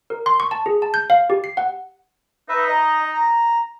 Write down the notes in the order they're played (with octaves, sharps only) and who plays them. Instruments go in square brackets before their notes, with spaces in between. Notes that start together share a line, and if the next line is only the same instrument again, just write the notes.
[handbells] A#4
C6
C#6
A5
G#4
A5
G6
F5
G4
C7
F#5
[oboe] D#4 [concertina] B4 E5
[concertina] D#5 A#5
A#5